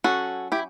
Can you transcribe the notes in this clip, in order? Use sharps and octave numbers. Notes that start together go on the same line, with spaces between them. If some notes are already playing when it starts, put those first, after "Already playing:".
F#3 C#4 F#4 A4
E4 G4